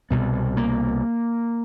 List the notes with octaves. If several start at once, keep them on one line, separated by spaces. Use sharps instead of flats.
C2 B2 B3
A#3